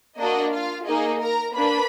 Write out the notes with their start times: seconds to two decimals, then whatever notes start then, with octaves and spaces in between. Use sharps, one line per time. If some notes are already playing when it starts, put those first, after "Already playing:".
0.19 A#3 D4 F#4 D#5
0.53 F4 F5
0.87 A#3 D#4 G#4 D#5
1.21 A#4 A#5
1.55 A#3 D4 B4 B5